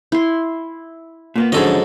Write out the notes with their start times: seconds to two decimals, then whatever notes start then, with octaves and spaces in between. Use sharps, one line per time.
0.12 E4 C6
1.36 A#2 A#3 B3
1.52 F2 G#2 D3 F#3 C#4 A4 D#5